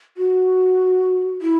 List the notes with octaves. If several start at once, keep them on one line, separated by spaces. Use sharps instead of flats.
F#4
E4